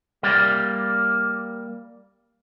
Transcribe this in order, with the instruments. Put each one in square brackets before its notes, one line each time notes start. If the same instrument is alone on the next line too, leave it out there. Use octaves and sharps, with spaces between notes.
[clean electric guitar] G3 A#3